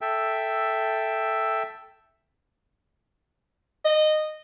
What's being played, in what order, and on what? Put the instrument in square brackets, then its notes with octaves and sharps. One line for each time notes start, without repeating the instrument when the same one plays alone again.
[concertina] A4 E5 G5
[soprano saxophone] D#5